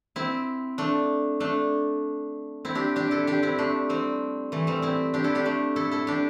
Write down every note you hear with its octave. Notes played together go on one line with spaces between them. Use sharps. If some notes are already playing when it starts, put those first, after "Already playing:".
C4 E4
A3 D4
A3 D4
C4 E4
D4 G4
D4 G4
E4 A4
D4 G4
C4 E4
A3 D4
G3 C4
E3 A3
G3 C4
C4 E4
D4 G4
E4 A4
D4 G4
A3 D4
E4 A4
E4 A4
D4 G4